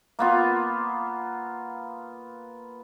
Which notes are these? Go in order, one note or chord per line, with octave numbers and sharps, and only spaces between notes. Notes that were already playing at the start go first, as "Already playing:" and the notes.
A#3 B3 F4